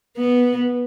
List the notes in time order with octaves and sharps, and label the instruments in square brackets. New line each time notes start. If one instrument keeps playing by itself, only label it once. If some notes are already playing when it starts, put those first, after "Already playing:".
[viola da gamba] B3